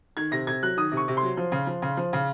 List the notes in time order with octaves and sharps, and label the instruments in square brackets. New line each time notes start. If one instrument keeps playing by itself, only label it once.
[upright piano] D#3 G#6
C3 A#6
C3 G#6
F#3 F#6
D#3 D#6
C3
C#6
C3
C6
F#3
F3
C#3
F3
C#3
F3
C#3